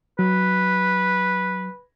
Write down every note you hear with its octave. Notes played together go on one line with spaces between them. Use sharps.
F#3 B4